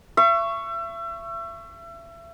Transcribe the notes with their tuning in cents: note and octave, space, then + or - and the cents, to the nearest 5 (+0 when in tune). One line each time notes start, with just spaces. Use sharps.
E5 +35 C#6 +0